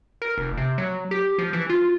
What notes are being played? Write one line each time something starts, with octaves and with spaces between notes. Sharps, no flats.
A#4
F1
C3
F#3
G4
F3
E3
F4